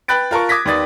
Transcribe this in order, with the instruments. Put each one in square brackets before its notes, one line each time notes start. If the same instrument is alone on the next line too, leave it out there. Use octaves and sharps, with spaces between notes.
[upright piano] B4 G5 B5 F#6 A6 D7
F4 A#4 A5 C#6
D6 D#6 G#6 A#6 B6
D#2 D#3 B3 D5 D#6 A6